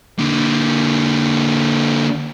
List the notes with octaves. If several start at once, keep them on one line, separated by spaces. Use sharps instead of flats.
D3 A#3